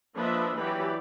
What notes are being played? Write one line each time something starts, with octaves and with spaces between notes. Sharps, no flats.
F3 A#3 D4 B4 D#5 E5
E3 F#3 G4 B4 D5 B5